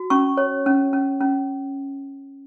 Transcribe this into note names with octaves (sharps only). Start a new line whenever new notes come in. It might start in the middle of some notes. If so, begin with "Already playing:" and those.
Already playing: F#4
C#4 C#6
C#5
C#4
C#4
C#4